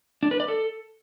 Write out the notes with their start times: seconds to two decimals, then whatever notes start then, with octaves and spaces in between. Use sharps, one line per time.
0.23 D4
0.31 B4
0.40 D5
0.48 A4